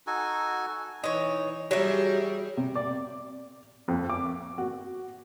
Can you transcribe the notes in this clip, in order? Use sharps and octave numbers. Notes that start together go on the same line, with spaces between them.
D#4 F#4 A4 G#5
E3 D#4 C#5
F#3 G3 G4 G#4 E5
C3
D5
F2
D6
F#4